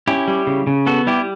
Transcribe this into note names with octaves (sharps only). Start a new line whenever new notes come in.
C#4 E4 G4
G3
C#3
C#3
B3 F#4 A4
G3 E4 G4